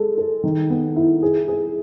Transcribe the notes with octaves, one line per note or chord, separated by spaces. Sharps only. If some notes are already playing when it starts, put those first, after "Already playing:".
Already playing: G#3 A4
A4
D#3
B3
E4
G#4
G#4